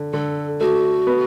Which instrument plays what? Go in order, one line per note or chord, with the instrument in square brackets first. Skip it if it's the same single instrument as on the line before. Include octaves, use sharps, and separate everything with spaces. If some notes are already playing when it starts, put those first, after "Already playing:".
Already playing: [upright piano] D3
[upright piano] D3 [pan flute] A4
[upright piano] A3 [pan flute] F#4
[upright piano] B3